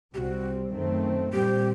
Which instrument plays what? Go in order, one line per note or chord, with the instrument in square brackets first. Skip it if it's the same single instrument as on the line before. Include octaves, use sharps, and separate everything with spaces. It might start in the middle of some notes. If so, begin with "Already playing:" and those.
[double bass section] C2 C3 G3 C4 [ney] F#4 G4
[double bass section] F#2 D#3 A3 C4
[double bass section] A#2 G3 C4 [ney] G4